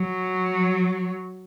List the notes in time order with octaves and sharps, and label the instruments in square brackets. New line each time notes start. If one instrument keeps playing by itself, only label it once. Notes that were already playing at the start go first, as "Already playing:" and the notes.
Already playing: [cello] F#3